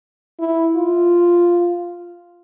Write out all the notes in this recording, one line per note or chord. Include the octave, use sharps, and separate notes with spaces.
E4
F4